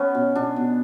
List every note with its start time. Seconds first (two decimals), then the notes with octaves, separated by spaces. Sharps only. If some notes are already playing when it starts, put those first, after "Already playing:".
Already playing: B3 C#4
0.15 B2
0.35 B2 D4
0.56 B2